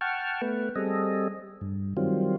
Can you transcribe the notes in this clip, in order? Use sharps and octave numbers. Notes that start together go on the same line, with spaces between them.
F#5 G5 A5 C#6 F6
A3 B3 B4
G3 C4 G#4 A4 D#5
G2
D#3 F#3 G3 C4 F4